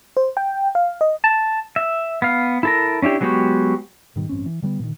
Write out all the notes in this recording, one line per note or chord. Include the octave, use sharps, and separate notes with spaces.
C5
G5
F5
D#5
A5
E5
B3 F5
E4 A4 A#4
C#4 D4 E4 G4
F#3 G#3 B3 F#4 G4
G#2 B2 D#3 G3
A1 G2 C4 C#4
E3
D3 G3 A3 B3
A#2 D3 D#3